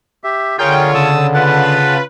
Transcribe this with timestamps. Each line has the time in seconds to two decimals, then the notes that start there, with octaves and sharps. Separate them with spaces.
0.24 G4 E5
0.59 D3 F4 G#4 A#4 C#5 G5
0.95 C#3 A5 D#6 E6
1.34 F4 B4 F#5 A5